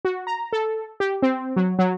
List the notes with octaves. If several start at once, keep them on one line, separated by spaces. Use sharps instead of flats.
F#4
A#5
A4
G4
C4
F#3
F#3